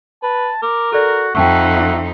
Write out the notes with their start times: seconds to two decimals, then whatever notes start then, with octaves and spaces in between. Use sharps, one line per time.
0.23 B4 A5
0.63 A#4 D6
0.92 F#4 A4 D5
1.35 F2 D#4 E5 F#5 G5 A5 C#6